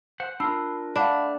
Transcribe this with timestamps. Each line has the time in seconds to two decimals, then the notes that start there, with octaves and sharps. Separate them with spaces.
0.20 C5 F#5
0.40 D4 F4 A#4 B5 E6 C7
0.96 A3 D4 F5 F#5 B5